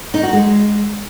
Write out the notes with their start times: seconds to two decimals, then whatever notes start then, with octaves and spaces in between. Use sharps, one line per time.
0.14 D#4
0.23 F#4
0.33 G#3